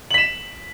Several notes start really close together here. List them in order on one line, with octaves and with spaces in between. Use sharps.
F#7 B6 E7